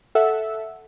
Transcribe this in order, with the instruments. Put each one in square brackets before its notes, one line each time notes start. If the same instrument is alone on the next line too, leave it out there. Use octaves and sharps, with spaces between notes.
[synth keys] A4 E5 F#5 E6